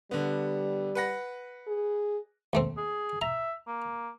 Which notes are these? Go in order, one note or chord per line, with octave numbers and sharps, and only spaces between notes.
D3 G3 B3
B4 F#5 A#6
G#4
D#2 A3 C4
G#4
E5 A#5
A#3